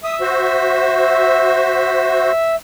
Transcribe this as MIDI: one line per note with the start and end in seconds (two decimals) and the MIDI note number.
0.04 2.55 76
0.04 0.17 87
0.21 2.32 66
0.21 2.32 72